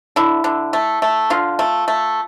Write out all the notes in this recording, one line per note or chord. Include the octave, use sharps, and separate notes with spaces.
D3 E4
D3
A3
A3
D3 F4
A3
A3